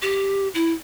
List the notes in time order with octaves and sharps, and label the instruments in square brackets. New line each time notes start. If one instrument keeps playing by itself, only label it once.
[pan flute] G4
E4